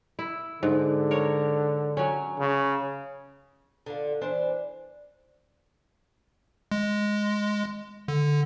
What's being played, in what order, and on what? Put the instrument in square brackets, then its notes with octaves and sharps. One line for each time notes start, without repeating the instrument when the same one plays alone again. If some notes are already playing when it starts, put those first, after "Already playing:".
[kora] E4
[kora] G#2 [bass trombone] D3
[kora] A#4 C#5
F#3 C#4
[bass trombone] C#3
[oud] D3 F4
E3 D4 C5
[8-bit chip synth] G#3
D3